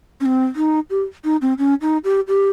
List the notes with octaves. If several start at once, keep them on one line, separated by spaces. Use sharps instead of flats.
C#4
C4
D#4
G4
D#4
C4
C#4
D#4
G4
G4